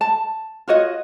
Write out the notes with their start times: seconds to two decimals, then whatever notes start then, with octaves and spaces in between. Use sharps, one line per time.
0.01 A5
0.68 F4 F#4 C#5 D#5